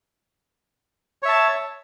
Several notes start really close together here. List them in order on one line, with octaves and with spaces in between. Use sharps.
C#5 E5 A5